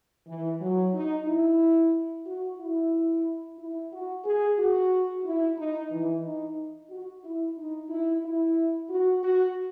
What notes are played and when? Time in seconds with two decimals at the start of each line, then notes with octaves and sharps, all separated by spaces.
0.27 E3
0.60 F#3
0.94 D#4
1.26 E4
2.26 F#4
2.59 E4
3.58 E4
3.92 F#4
4.24 G#4
4.58 F#4
5.24 E4
5.57 D#4
5.91 E3
6.24 D#4
6.90 F#4
7.24 E4
7.57 D#4
7.89 E4
8.23 E4
8.89 F#4
9.22 F#4